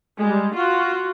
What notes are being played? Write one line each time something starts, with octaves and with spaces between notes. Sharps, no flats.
G3 G#3
F4 F#4